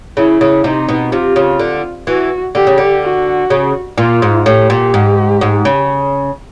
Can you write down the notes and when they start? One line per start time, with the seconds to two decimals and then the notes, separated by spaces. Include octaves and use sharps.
0.17 C#3 E4
0.41 C#3
0.64 C3 D#4
0.89 B2
1.12 C3 F4
1.36 C#3
1.59 D3
2.07 E3 F#4
2.55 D3 G4
2.67 C#3
2.78 D3
3.03 F#4
3.50 C#3
3.98 A#2 F4
4.22 G#2
4.46 A2 G4
4.70 A#2
4.94 G#2
5.41 G#2
5.65 C#3